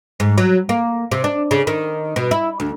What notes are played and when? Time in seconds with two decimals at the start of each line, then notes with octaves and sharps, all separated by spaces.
0.20 G#2
0.38 F#3
0.69 A#3
1.11 C3
1.24 D4
1.51 C#3
1.67 D#3
2.16 B2
2.31 E4
2.60 D2